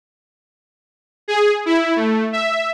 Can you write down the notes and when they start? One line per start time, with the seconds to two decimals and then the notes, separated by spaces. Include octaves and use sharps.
1.28 G#4
1.66 E4
1.96 A3
2.33 E5